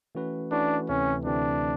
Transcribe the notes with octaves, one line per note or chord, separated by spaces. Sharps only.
E3 A3 C#4 F#4 B4
E3 A3 C#4 D4 F#4 B4
D2 C3 E3 A3 C4 C#4
D2 C3 E3 A3 C4 D4